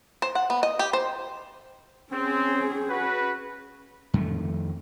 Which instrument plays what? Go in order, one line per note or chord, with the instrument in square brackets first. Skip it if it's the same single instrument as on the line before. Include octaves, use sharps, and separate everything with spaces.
[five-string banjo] C5
F#5
B3
D#5
G4
C5
[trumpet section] C4 [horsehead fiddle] C#4 G#4
[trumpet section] F#4 B4
[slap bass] F2 D#3 A3